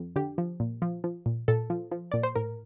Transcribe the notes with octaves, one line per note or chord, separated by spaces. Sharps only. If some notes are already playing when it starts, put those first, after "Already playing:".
Already playing: F2
D3 G4
F3
A#2
F3
F3
A#2
A#2 A4
F3
F3
A#2 D5
C5
A2 A#4